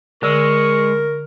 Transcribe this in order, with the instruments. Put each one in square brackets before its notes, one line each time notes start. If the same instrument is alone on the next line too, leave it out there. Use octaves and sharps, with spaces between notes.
[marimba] D3 E6 [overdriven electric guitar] G#3 [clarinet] A#4 [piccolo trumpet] C#6